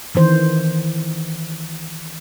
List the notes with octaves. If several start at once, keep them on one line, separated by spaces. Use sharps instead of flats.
D#3 E3 C5